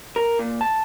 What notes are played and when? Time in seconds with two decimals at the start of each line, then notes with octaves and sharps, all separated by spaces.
0.16 A#4
0.39 A#2
0.61 A5